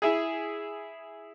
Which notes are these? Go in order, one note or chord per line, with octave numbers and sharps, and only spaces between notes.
E4 G#4